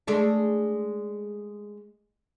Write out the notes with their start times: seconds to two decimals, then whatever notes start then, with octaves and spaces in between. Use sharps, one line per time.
0.07 G#3 A3 D4